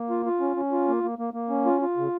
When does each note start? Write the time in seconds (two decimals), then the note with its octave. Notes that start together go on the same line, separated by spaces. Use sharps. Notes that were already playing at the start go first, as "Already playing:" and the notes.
Already playing: A#3
0.10 F4
0.26 F4
0.40 C#4
0.57 C#4
0.72 F4
0.88 A#3
1.03 A#3
1.19 A#3
1.34 A#3
1.50 C#4
1.66 F4
1.82 F4
1.97 C#3